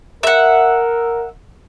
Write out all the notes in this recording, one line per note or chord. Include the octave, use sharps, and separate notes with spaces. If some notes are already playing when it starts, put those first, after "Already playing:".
A#4 E5 F#5